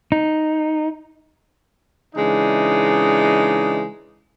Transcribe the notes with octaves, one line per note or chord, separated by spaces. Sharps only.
D#4
C#3 E3 G#3 D4 D#4